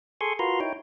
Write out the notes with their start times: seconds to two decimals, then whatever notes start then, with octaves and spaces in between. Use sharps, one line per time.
0.21 G#4 A4 G#5 C6 C#6
0.39 F4 F#4 A#4 B4 A#5 C6
0.61 D#4 E4 C#5 G5